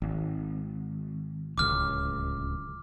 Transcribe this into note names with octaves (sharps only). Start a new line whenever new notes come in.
G#1
D1 C#2 D6 F6